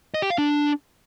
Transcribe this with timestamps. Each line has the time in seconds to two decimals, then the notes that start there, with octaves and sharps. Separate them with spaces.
0.14 D#5
0.22 G4
0.30 F5
0.38 D4